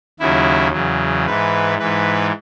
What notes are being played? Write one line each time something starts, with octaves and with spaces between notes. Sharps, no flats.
D#2 C#3 F#3 E4
E2 C#3 F#3
G#2 E3 B4
G#2 E3 B4